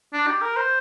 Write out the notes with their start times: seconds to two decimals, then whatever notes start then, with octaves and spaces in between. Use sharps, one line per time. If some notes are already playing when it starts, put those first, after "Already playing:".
0.13 D4
0.27 G4
0.42 A#4
0.56 C5